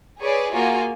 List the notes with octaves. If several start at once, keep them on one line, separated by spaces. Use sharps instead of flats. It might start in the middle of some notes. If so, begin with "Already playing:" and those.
G#4 B4 C#5 D5
A#3 F4 F#4 G#4 G#5